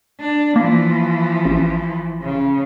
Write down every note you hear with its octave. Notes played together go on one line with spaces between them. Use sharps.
D4
E3 F3 A#3
A1
C#3